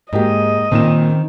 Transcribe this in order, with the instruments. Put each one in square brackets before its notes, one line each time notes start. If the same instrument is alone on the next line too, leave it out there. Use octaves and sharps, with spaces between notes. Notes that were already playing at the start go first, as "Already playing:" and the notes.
[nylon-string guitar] G#2 [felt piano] G#3 A#3 G4 [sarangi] D#5
[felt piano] A#2 C#4 E7 [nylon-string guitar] D#3 C4